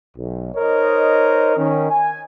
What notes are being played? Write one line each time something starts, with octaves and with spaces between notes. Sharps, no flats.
B1
D#4 A#4 C5 C#5 D#5
D#3 C#4
G#5